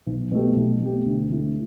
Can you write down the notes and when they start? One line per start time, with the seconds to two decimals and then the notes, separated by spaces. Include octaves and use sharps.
0.06 B1
0.32 B2 A3 G4
0.56 B1
0.81 B2 A3 G4
1.06 D2
1.30 D3 A3 E4